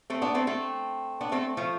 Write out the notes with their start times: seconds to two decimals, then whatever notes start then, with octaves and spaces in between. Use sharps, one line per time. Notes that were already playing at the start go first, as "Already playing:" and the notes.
0.10 A3 C4
0.22 B3 D4
0.34 A3 C4
0.47 A3 C4
1.21 B3 D4
1.32 A3 C4
1.57 F3 A3